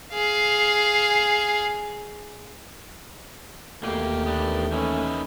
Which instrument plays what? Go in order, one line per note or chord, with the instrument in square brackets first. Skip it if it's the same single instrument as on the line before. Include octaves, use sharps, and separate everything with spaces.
[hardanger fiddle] G#4 F5
[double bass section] D#2 D#3 E3 [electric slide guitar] B2 A#3 [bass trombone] A3 [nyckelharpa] G4
[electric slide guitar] B3 D4
[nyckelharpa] C#4 [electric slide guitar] D#4 B4 E5